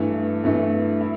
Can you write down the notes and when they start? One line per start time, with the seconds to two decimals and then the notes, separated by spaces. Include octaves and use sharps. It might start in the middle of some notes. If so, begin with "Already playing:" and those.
Already playing: G2 E3 A3
0.44 G2 E3 A3
1.01 E4